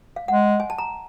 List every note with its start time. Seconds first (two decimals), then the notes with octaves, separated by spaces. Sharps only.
0.16 F5
0.28 G#3 F#5
0.60 G#5
0.70 A5
0.78 A#5